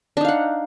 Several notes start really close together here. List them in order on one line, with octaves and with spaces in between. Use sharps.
D4 D#4 F5 F#5